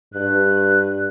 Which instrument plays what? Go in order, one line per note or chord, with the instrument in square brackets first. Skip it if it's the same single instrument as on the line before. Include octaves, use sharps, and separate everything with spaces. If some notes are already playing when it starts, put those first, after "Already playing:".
[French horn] G2 [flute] F#6